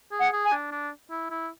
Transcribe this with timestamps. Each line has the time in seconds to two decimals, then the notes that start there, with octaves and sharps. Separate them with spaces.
0.12 G#4
0.19 F#5
0.32 G#4
0.45 G#5
0.52 D4
0.72 D4
1.11 E4
1.30 E4